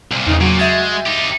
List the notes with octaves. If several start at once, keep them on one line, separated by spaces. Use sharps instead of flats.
C2 A#2
E2 C#3 D#4
A#2 F#3 F#4
G#3 E5 G6 A6
D#4 G4